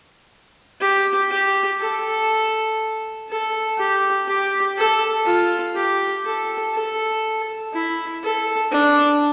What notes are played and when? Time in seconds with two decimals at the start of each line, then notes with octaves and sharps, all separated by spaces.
0.81 G4
1.31 G4
1.80 A4
3.29 A4
3.78 G4
4.28 G4
4.77 A4
5.26 F4
5.75 G4
6.25 A4
6.74 A4
7.73 E4
8.23 A4
8.71 D4